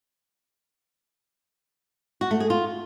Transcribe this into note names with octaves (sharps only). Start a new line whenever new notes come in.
F#4
A3
G#4
F4